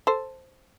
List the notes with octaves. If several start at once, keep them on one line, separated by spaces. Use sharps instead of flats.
A4 C5